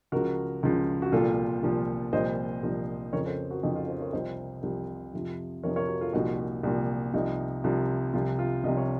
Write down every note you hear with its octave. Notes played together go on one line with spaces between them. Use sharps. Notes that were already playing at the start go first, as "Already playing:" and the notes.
C#2 C#3 F3 F#4 A#4
C#2 C#3 F3
F#4
C2 A#2 F3 F4 A4
C2 A#2 F3
C2 A#2 F3 C5 D#5
C2 A#2 F3
F2 C#3 F3 A#4 C#5
A4 C5
F#4 A#4
F2 C#3 F3 D#4
F4
A4 C5
A#4 C#5
C2 C3 F3 C5 D#5
C2 C3 F3
F2 C3 F3
F2 C3 F3 A#4 C#5
A#4 C#5
F#4 A#4
F4 A4
C2 A#2 F3 D#4 F#4
C2 A#2 F3
C2 C3 F3 D#4
C2 C3 F3
C2 C3 F3 F4
F4
C2 C3 F3 D#5
C#5